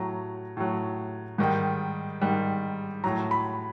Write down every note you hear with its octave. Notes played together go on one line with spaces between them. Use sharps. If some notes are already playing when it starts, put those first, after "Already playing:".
Already playing: A2 F#3 A#5
A2 F#3
G#2 D#3 G3
G#2 D#3 G3
A2 F#3 A#5
B5